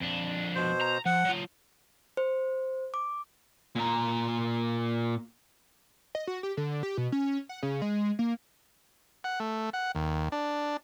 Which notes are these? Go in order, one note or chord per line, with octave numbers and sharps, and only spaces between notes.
F2 D4
B2 C5
A#5
F3 F#5
F#3 F4
C5
D6
A#2 A#5
D#5
F#4
G4
D3
G4
B2
C#4
F#5
C#3
G#3
A#3
F#5
A3
F#5
D#2
D4